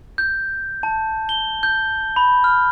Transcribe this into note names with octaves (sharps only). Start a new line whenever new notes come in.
G6
A5
G7
G6
B5
F6